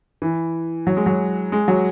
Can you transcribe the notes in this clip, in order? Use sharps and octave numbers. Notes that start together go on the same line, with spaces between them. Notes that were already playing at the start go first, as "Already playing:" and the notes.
E3
F#3
G#3
F#3
G#3
F#3